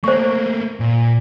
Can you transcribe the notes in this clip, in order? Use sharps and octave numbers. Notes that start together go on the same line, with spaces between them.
A3 A#3 C5 C#6
A#2